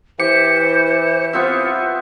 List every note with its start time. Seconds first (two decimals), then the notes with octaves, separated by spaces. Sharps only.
0.20 E3 G4 C5 C#7
1.33 B3 C4 F4 E5